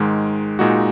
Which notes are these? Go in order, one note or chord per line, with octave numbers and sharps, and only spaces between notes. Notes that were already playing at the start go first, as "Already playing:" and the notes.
Already playing: G#2 D#3 G#3
A#2 G#3 D#4 F#4